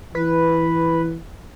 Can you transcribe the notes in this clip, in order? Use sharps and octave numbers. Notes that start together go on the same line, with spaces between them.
E3 B4